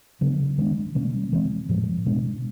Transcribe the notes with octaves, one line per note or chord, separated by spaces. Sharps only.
C#3 F#3 B3 D4
D#3 G#3 B3 D4
B2 G3 A#3 C#4
E3 G#3 C4
A2 F3 G#3
B2 G#3 B3 D4